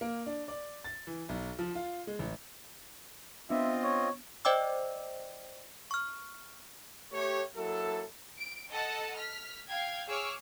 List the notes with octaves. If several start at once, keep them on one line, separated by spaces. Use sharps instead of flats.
A#3
D4
D5
A6
E3
B1
F3
F4
G#3
A1
B3 C4 D4 F4 D#5 E5
C#5
C5 D5 D#5 G5 D6 E6
C#6 F6
A3 G4 C#5
F#3 A#3 E4 A4
D7
A4 D#5 F#5 A5
F6 B6
F5 G5 G#6
G#4 C#5 C#6 D6 E6 F6